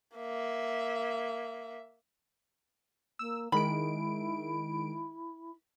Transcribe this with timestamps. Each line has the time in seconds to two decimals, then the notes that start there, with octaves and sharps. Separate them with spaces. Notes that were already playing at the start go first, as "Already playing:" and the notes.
0.17 A#3 E5
3.19 A#3 E6
3.52 D#3 G#3 E4 B5 D7